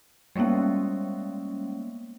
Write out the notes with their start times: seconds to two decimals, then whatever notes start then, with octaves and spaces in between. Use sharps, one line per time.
0.36 G3 G#3 A#3 B3 C#4